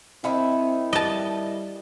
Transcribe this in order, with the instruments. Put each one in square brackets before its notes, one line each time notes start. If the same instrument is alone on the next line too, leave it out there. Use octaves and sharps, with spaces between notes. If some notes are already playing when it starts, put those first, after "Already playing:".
[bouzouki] D#3 A4 E5 [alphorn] C4 [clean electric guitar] E4
[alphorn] G3 [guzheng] D#5 A5